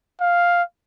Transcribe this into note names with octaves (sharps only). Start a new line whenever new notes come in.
F5